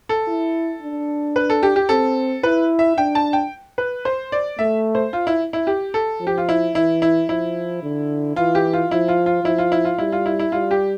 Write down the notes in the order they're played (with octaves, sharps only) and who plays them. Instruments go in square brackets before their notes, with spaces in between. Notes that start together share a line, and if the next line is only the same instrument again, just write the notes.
[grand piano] A4
[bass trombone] E4
D4
[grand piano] B4
A4
G4
G4
[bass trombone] C4 [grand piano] A4
[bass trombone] E4 [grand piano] B4
[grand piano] E5
[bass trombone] D4 [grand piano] G5
[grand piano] A5
G5
B4
C5
D5
[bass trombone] A3 [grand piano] E5
[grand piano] C5
F4
E4
E4
G4
A4
[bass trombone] F3
[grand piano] G4
F4
E4
[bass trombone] E3 [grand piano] E4
[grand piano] E4
[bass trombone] F3 [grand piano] E4
[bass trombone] D3
[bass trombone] E3 [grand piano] F4
[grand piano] G4
F4
[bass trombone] F3 [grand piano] E4
[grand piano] F4
F4
[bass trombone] F3 [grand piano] E4
[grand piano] F4
E4
F4
[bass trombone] G3 [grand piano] E4
[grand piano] F4
E4
E4
[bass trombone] G3 [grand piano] F4
[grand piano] G4